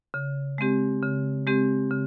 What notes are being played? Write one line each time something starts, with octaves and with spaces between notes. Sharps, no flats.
C#3
G#3 C4 G4
C#3
G#3 C4 G4
C#3